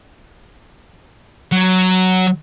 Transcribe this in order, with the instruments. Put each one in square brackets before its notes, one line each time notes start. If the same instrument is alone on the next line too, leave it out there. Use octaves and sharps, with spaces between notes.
[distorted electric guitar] F#3